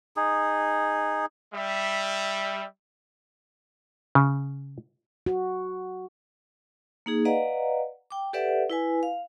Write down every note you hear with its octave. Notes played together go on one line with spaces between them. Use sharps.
D#4 G#4
G3 E5
C#3
F#4
A#3 D#4 G#4
B4 D5 D#5 F5 F#5 A#5
G5 D6
G4 A4 B4 D5 E5 F#5
E4 B4 G#5
F5